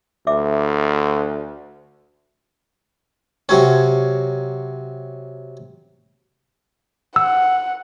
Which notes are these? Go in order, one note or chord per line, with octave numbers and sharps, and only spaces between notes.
D2 D5 E5 D6
C3 F#3 C#4
F#5 E6